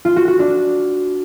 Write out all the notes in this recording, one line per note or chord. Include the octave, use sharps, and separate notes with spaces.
F4
F#4
F#4
D4